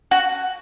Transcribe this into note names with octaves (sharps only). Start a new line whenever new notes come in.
F#4